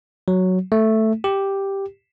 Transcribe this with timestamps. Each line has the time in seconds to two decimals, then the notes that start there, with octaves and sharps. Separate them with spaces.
0.28 F#3
0.72 A3
1.24 G4